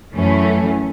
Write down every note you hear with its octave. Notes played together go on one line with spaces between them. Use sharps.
F#2 E3 A3 C#4